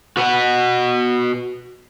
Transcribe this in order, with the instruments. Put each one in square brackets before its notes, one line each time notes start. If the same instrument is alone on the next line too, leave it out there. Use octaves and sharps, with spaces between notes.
[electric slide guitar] F#4 B4 F#5